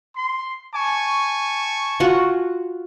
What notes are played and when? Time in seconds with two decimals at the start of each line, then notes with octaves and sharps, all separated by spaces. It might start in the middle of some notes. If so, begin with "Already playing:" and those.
0.15 C6
0.75 G#5 A5 C#6
2.00 F4 F#4 F#5